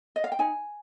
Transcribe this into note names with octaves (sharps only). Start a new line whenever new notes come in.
D#5
F5
G5
D#4 G#5